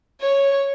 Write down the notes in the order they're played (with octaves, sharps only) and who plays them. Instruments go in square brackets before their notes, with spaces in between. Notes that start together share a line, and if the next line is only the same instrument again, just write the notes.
[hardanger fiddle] C#5